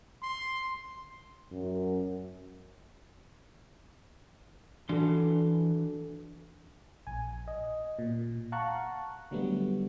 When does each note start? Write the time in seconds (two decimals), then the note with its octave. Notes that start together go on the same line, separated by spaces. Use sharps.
0.23 C6
1.51 F#2
4.89 E3 D4 F#4 A4 C6
7.07 A#1 G#5
7.48 D#5
7.99 A#2
8.52 F5 F#5 A5 A#5 C#6 F#6
9.31 D3 F#3 G3 A3 B3